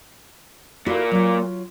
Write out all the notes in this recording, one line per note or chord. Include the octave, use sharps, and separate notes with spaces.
A#2 A#3 E4 F#4 A4
F#3 F4